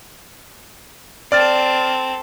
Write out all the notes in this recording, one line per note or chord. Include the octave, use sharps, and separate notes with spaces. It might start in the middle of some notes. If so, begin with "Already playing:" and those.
C4 A4 D5 F6 A6